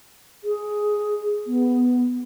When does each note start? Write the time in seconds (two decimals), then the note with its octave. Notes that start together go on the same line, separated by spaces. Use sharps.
0.44 G#4
1.47 B3